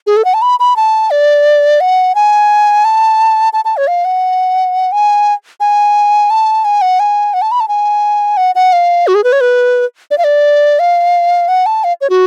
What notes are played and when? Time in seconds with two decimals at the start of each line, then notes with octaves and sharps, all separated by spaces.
0.07 G#4
0.17 A4
0.25 F#5
0.34 A5
0.42 B5
0.60 B5
0.76 A5
1.11 D5
1.81 F#5
2.15 G#5
2.85 A5
3.53 A5
3.65 A5
3.77 C#5
3.87 F5
4.05 F#5
4.92 G#5
5.60 G#5
6.30 A5
6.65 G#5
6.82 F#5
7.00 G#5
7.34 F#5
7.42 A5
7.52 B5
7.60 A5
7.68 G#5
8.37 F#5
8.55 F#5
8.73 F5
9.07 F#4
9.15 G#4
9.24 B4
9.32 C#5
9.41 B4
10.11 D5
10.18 F5
10.24 D5
10.79 F5
11.48 F#5
11.66 A5
11.84 F5
12.01 C#5
12.10 F#4